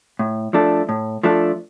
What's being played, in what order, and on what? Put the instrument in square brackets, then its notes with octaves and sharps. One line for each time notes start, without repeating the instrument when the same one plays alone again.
[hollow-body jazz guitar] A2
F3 A3 D4 A4
A2
F3 A3 D4 A4